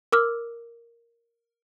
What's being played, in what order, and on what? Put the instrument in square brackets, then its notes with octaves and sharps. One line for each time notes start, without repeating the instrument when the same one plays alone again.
[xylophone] A#4 D6 E6 F6